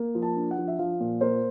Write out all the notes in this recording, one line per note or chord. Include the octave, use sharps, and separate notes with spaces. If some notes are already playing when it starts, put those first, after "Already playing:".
Already playing: A#3
F3
A5
D4
F#5
F3
E5
F3 F5
A#2
A#3 C5